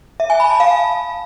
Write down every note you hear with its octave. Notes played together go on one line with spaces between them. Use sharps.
E5
G#5
B5
A5
F5